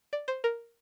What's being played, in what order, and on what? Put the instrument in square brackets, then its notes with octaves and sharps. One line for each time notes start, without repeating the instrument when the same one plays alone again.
[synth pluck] D5
C5
A#4